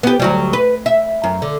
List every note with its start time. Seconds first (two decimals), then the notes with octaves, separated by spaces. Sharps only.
0.03 B3 G4
0.20 D2 F#3 G3
0.53 B4
0.86 E5
1.24 F#2
1.42 D3